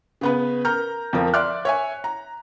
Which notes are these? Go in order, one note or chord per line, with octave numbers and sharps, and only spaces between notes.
C#3 B3 B4
A#4 A#5 F6 G6
F2 F3 A#4
D5 E5 C6 D6 F6 F#6
C#5 E5 G#5
A#5